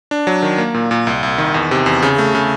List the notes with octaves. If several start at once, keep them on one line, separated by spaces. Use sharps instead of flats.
D4
F#3
D#3
A#3
A#2
A#2
C2
C2
D#3
E2
C3
E2
C#3
A3
C#3